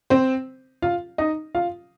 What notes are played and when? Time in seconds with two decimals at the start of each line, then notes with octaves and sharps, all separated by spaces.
0.10 C4 C5
0.82 F4 F5
1.18 D#4 D#5
1.55 F4 F5